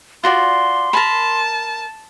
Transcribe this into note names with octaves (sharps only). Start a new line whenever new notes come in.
F4 F#4 D5 C6
A#4 A5 B5